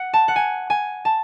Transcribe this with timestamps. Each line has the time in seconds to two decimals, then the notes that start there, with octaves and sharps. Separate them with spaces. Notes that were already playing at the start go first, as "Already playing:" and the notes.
Already playing: F#5
0.13 A5
0.28 F#5
0.36 G#5
0.70 G#5
1.05 A5